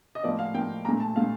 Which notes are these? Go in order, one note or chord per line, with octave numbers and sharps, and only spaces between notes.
D#5
A2 F3 A#3 D5
F5
A2 F3 A#3 G5
A#2 A3 A#5
A5
A#2 A3 F5